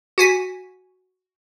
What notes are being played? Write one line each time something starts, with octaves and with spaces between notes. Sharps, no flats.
F#4 G#5 B6